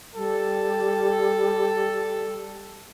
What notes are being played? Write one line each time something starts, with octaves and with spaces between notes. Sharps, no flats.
G3 A4